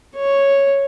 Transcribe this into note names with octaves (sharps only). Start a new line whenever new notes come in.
C#5